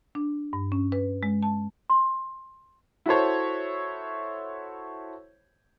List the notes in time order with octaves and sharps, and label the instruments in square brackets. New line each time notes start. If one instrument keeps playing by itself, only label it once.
[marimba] D4
G2
C#4
B4
G#3
A5
[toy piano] C6
[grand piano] E4 F#4 A4 C5 C#5